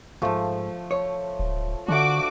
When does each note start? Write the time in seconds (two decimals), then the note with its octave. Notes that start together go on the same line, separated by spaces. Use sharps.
0.22 D#2 G#2 F3 A3
0.91 C#5
1.39 D1
1.88 D3 A3 D4 F#4 D6